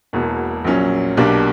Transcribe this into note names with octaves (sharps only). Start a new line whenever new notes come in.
E1 E2 B2 A#3
A#1 A#2 F#3 C#4
B1 B2 A#3 D4 G4